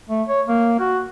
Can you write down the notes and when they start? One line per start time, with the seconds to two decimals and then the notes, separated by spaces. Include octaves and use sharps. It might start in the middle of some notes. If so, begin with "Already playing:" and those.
0.09 A3
0.28 C#5
0.48 A#3
0.80 F#4